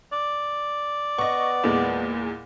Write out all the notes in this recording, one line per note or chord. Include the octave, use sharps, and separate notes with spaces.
D5
B3 D#5 C#6
E2 A#2 G#3